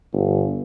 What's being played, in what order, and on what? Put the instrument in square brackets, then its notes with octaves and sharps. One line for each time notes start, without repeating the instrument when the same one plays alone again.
[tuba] G1